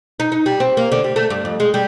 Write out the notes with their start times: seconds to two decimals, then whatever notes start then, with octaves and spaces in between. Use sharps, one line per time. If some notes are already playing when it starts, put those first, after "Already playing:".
0.20 D#4
0.32 D#4
0.46 G3
0.60 C4
0.77 A#3
0.92 D3
1.04 G3
1.16 A3
1.30 G2
1.45 F2
1.60 G#3
1.74 G3